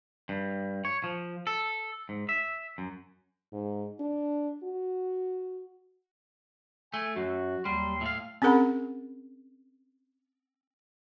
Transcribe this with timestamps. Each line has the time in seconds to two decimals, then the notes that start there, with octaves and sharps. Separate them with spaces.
0.29 G2
0.85 C#5
1.04 F3
1.47 A4
2.09 G#2
2.29 E5
2.78 F#2
3.52 G#2
4.00 D4
4.63 F#4
6.94 A3 G#5
7.16 F#2 F#4
7.65 D#2 F#3 G3 C6
8.01 A2 F5
8.42 C4 C#4 G#4 A#4 F#5 B5